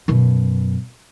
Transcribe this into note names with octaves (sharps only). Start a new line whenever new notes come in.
F#2 B2